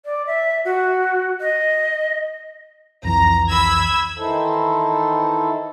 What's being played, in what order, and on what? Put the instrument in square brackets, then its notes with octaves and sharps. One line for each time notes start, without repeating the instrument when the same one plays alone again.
[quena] D5
E5
F#4
D#5
[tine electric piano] C2 F2 E3 [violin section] A#5
[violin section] B5 E6 G#6
[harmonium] D#3 E3 D#4 E4 A4 C5